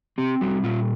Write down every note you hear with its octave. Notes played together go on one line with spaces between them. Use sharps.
C4 G4
G3 F#4
A#2 F4